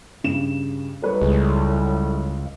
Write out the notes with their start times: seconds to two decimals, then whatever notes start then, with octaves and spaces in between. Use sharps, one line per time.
0.24 G2 C#3 E7
1.02 A2 F#3 G3 A#4 B4 C#5
1.22 C#2 G#3